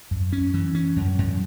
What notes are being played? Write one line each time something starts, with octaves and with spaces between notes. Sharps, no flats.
F#2
C#4
E3
C#4
F#2
F#2